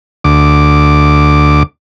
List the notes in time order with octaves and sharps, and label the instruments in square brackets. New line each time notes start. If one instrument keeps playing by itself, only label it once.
[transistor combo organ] D2 D6